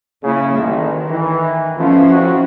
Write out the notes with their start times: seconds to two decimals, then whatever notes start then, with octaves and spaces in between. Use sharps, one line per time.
0.23 C#3 A#3 E4
0.57 A1 D#3
1.09 E3
1.79 B2 F3 A3 C#4 E4 F4
2.10 F2 F#4